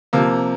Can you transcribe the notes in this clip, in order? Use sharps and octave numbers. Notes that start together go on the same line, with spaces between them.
C3 F3 A#3